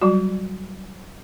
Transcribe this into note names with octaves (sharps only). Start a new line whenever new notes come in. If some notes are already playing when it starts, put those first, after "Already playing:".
F#3 G3 F#4